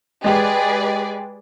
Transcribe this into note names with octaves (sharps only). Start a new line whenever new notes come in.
G#3 G4 G#4 B4 D5